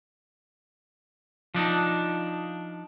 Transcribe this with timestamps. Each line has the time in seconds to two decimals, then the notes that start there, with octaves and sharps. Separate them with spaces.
1.54 F3 D4 D#4